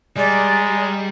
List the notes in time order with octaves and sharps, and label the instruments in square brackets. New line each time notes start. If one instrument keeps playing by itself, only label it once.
[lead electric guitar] G3 [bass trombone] G#3 [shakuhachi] D5 [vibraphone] G#5 A#5